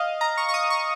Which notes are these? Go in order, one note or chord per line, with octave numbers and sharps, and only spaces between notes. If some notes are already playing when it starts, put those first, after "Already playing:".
Already playing: D#5 F5
A#5
C#6
C#6
D#6
C#6